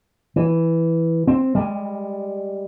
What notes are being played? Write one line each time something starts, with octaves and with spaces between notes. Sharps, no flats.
E3
C4
G3 G#3